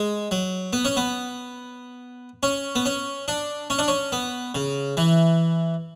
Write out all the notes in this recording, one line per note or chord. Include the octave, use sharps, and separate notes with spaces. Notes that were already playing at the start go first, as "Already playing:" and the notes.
Already playing: G#3
F#3
B3
C#4
B3
C#4
B3
C#4
D4
C#4
D4
C#4
B3
C#3
E3